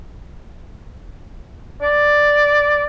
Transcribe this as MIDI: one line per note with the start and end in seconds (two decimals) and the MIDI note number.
1.82 2.85 74